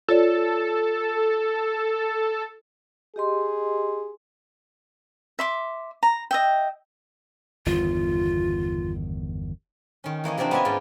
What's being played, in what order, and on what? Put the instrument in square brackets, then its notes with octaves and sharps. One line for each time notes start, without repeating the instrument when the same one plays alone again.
[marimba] F4 C#5 D5 [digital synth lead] A4
[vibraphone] G4 D#5 C6 [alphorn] G#4
[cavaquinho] E5 C6 D6
A#5
D#5 E5 G5
[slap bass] G1 E2 D#3 [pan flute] F4
[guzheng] D#3 C#4
E3 A#3 C#5 D#5
C3 F3 A#3 C4 D4 D#4
B3 C#4 D#5 E5 G#5
G#2 D#4 F4 D5